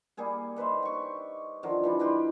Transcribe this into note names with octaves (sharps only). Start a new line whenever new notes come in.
G3 A#3 G#4 G#5
D#4 B4 C5 E5
G5 C#6
D3 D#3 F3 A#4
E3 G3 D4
F4 G4 B4 D#5